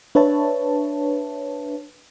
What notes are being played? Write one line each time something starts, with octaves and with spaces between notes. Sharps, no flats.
D4 B4 C#5 E5 A5